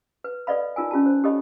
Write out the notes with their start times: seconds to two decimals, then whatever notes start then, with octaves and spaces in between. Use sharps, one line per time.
0.24 B4
0.47 A4 B4 D5 D#5 F5 B5
0.76 D#4 F4 A#4 G#5
0.91 C#4 F4 G4 A5
1.06 C5
1.23 C#4 G4 A4 C#5 D#5 B5